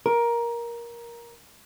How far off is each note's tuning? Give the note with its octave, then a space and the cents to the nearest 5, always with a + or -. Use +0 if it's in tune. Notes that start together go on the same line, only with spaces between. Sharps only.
A#4 +15